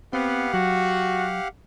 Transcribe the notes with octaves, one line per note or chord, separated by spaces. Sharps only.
B3 C4 G4 F5 F#5
F#3 F#4